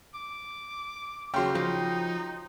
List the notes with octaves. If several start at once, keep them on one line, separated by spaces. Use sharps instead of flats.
D6
C#3 F#3 G5 C6
F3 D#4